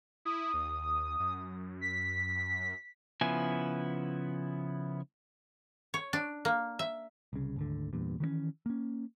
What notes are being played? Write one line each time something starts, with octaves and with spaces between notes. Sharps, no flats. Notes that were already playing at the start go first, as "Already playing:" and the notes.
E4 D#6
D#2
F#2
B6
C#3 F3 B3 E4 G#5
C#5
D4
A#3
E5
C2 C#3
G#1 D2 D3
E2 G2 A#2
D#3 E3 G#3 C#4
A#3 C#4